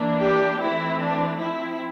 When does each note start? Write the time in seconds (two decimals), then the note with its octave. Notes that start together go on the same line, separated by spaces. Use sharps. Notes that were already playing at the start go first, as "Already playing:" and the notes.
Already playing: E3 A#3 D4
0.20 G4
0.59 E3 A3 C4 E4
0.99 D4
1.37 F3 C4 E4